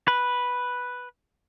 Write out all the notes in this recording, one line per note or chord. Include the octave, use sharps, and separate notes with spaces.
B4